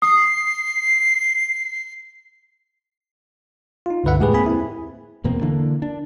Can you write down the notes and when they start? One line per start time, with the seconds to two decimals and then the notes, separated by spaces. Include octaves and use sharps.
0.02 D#6 C7
3.86 D#4 F4
4.04 C#2 G2 D3 B4 E5 F#5
4.19 E2 A2 G#3 G4 G#4 B4
4.33 A#3 C4 G#4 G#5 B5
4.46 C4 E4
5.24 E2 B2 A#3 C4
5.41 D3 E3 A#3 D4
5.82 D4